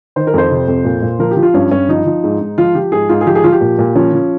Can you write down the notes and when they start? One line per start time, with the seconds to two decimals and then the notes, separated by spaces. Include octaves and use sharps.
0.16 D#3 C5
0.27 A#4
0.34 F2 C5
0.50 C3
0.68 F2
0.85 A#2
1.02 A#2
1.19 F3 A#4
1.31 G4
1.37 F3
1.43 F4
1.54 G2 C#4
1.71 G2 C#4
1.89 F3 D#4
2.06 F3
2.24 G#2
2.40 G#2
2.58 F3 F4
2.75 F3 G4
2.92 G#2 G#4
3.09 G#2 F4
3.21 G#4
3.27 F3 G4
3.35 G#4
3.44 F3 F4
3.52 G4
3.61 A#2
3.79 A#2
3.95 F3 C#4
4.13 F3